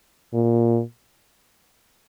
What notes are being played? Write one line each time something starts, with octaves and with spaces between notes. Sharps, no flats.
A#2